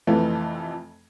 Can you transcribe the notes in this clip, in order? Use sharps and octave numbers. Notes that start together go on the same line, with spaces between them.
F2 C3 E3 F3 A3